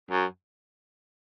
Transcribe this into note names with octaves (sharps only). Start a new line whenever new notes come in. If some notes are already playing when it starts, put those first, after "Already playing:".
F#2